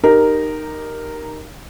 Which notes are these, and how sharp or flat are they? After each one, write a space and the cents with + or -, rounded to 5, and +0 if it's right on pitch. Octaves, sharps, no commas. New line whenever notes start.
D#4 -15 G4 +0 A#4 +0